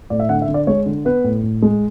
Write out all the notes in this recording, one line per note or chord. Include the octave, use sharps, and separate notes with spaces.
A2 D5
E5
D3 F#5
E5
D3
D5
G#3 C#5
D3
B3 B4
A2
A2
G#3